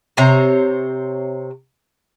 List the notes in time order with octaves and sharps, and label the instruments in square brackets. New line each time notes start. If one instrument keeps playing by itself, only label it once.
[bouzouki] C3 C5 C#5 A#5